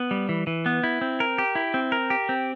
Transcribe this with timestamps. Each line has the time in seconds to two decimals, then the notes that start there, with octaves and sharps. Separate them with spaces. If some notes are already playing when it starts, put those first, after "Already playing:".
Already playing: B3
0.11 G3
0.29 E3
0.47 E3
0.66 B3
0.84 E4
1.01 C4
1.20 A#4
1.38 G4
1.55 E4
1.74 C4
1.92 A#4
2.10 G4
2.29 C4